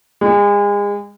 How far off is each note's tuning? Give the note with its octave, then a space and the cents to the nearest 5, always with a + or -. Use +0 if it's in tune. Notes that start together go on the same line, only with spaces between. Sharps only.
G#3 -35